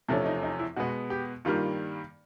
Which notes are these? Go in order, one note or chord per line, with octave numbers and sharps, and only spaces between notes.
E2 C3 F3 A3 C#4 D4
D#4
D#4
E4
B2 G#3 B3 F#4
G4
G2 D#3 G3 A#3 F4